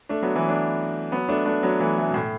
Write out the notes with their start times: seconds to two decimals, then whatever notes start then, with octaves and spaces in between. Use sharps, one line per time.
0.09 A3 D4
0.22 F#3 B3
0.35 E3 A3
0.48 A3 D4
1.12 F#3 B3
1.29 A3 D4
1.46 A3 D4
1.63 F#3 B3
1.80 E3 A3
1.98 E3 A3
2.09 B2
2.14 A2